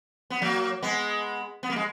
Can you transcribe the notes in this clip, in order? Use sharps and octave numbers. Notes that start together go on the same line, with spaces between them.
B3
F#3 A#3
G#3 B3
B3
A#3
G#3